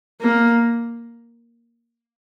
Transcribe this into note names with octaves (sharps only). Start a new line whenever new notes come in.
A#3